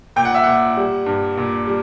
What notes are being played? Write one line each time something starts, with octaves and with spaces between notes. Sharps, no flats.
A#2 G5
F#5
E5
A#2 F#5
G3
G2
A#2
G3